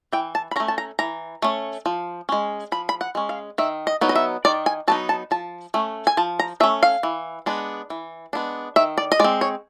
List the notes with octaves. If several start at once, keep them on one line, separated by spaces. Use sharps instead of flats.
E3 G5
A5
B5
A3 C#4 A#5
A5
A#5
E3 A#5
A3 C#4
F3
G#3 C#4
F3 B5
B5
F#5
G#3 C#4
F5
D#3 E5
D#5
F#3 B3 D#4
D#5
E5
D#3 D5
G#5
F#3 B3 D#4 A5
A5
F3 A5
A3 C#4
G#5
F3 A5
A#5
A3 C#4 E5
F5
E3
G#3 B3 D4
E3
G#3 B3 D4
D#3 E5
D5
D#5
G#3 C4 D5
C#5